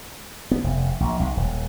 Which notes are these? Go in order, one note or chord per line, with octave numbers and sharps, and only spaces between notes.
B3
F1
A#1
B1
D#1